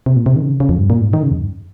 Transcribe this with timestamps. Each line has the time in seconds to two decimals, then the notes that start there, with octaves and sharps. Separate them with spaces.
0.06 C3
0.16 A#2
0.26 C3
0.36 D#3
0.42 C#3
0.60 C#3
0.69 F2
0.78 G2
0.90 A#2
1.01 G#2
1.13 D#3
1.23 C#3
1.31 F2
1.41 G2